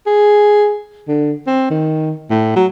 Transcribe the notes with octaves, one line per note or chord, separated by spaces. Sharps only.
G#4
D3
C4
D#3
A2
F#3